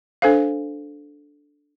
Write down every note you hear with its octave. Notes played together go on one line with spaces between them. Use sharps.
D4 A4 C5 F5